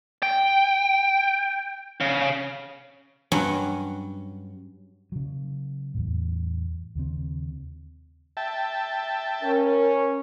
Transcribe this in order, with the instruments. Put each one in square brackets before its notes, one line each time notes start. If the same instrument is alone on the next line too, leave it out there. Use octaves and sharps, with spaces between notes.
[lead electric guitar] G5
C#3
[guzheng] G2 F#3 C#4 F#5
[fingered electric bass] C#3 F#3
E2 A2
D#2 C#3 C4
[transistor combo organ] E5 G5 A5
[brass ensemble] C#4 [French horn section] A#4